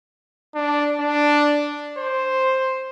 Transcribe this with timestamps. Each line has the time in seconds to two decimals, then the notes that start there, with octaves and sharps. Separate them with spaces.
0.55 D4
1.00 D4
1.98 C5